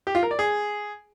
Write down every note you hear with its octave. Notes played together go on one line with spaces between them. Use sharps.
G4
F4
A#4
D5
G#4